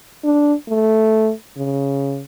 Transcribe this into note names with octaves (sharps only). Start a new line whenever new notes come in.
D4
A3
C#3